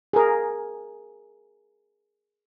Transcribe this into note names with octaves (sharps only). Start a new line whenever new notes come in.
G#4 A#4